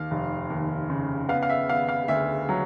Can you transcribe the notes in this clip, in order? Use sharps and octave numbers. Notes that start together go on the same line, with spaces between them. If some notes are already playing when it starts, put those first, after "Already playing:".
Already playing: D#2 F5
F1
D#2
C#3
B3 F5
F5
E5
B3 F5
F5
D2 E5
F#3